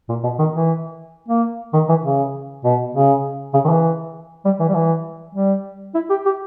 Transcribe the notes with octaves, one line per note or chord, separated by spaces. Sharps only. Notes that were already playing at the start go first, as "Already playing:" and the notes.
A#2
B2
D#3
E3
A#3
D#3
E3
C#3
B2
C#3
C#3
D#3
E3
G3
E3
G3
E3
G3
E4
G4
G4